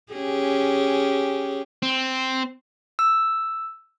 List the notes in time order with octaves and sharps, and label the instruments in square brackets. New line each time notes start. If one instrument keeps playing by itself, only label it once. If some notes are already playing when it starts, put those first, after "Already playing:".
[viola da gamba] C#4 G4 G#4
[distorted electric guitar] C4
[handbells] E6